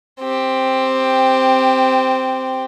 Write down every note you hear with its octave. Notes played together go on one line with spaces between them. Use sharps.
C4 G4